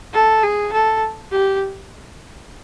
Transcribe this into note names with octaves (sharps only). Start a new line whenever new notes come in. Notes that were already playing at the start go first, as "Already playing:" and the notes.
A4
G#4
A4
G4